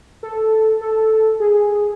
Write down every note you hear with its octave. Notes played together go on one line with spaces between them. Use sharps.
A4
A4
G#4